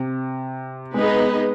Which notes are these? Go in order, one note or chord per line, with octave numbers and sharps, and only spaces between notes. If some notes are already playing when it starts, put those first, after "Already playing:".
Already playing: C3
G#3 B3 D#4 G#4 B4 D#5